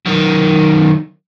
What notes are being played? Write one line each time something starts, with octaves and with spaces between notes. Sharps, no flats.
F#2 D#3